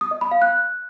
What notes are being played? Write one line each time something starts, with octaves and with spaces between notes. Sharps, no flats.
D#6
D#5
B5
F5
F#6